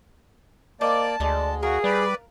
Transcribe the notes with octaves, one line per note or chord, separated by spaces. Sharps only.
A#3 C5 D5 D#5 A5 D6
D2 G#3 A4 D5
F#4 G#4 A#4 F5
G3 B4 D5